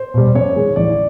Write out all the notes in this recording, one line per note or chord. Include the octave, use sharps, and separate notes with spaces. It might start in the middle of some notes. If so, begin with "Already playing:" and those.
Already playing: C5
B2 G3
F#2 C#5
D#3 G#3
A1 D5